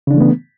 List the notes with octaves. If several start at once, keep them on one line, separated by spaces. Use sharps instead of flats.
C#3 E3 A3 B3 D4